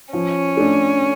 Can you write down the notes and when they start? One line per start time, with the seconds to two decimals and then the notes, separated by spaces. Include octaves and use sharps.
0.13 F3 C#4
0.57 A3 D4